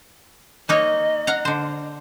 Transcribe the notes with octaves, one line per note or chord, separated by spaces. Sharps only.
A#3 D#4 C#5 D#5
F5 F#5 A#5
D3 C5